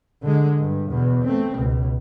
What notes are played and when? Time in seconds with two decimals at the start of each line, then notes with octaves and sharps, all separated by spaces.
0.23 D3 G#3
0.59 G2
0.90 E2 B2
1.24 A3 C4
1.56 C#2 B2